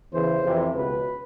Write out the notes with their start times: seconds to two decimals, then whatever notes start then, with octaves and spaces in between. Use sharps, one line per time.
0.12 E2 C#3 E3 C5
0.43 F2 C3 E3
0.74 C#2 B2 B4